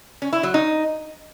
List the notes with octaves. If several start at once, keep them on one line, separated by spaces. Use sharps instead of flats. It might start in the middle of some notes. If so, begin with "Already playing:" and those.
C#4
E4
F#3
D#4